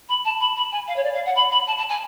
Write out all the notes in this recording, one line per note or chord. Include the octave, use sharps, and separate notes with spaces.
B5
A5
B5
B5
G#5
F5
C#5
D5
F5
F#5
B5
B5
A5
A5
G#5